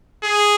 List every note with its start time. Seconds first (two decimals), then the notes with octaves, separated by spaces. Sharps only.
0.24 G#4